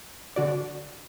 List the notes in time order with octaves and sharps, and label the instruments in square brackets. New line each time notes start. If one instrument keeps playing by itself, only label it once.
[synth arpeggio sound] D3 F#4 D5